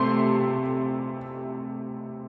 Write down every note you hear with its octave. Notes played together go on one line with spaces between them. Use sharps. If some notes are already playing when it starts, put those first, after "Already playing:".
Already playing: C3 A3 C6